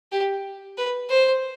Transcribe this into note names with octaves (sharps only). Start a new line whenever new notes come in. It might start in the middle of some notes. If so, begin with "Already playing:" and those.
G4
B4
C5